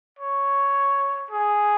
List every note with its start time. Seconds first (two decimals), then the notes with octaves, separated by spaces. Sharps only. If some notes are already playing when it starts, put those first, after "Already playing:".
0.19 C#5
1.31 G#4